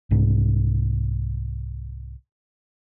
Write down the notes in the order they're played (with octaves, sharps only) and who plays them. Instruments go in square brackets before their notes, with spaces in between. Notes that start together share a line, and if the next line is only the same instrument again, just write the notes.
[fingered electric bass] C2 G#2